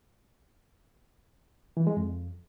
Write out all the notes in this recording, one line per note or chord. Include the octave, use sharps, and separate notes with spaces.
E3
G#3
F2